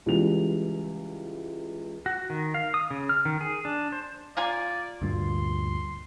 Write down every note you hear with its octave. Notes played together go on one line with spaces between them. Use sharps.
C#2 E3 G3 F7
F#4
D#3
F5
D#6
C#3
F6
D#3
G#4
D4
C5
A#3 F4 D5 G#5
D2 G2 A#2 C6